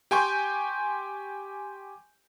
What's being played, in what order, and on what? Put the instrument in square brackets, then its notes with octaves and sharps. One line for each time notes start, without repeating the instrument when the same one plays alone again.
[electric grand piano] G4 G5 G#5 C6 C#6 G6